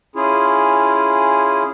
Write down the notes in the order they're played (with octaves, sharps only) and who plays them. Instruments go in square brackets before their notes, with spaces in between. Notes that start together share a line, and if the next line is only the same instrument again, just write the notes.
[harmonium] C#4 E4 F4 G#4